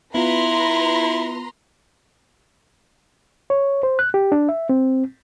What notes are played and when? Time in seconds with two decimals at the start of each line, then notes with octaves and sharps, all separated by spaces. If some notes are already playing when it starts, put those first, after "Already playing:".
0.15 B3 E4 F4 B4 A#5 C6
3.50 C#5
3.83 C5
3.99 F#6
4.14 G4
4.32 D4
4.49 E5
4.69 C4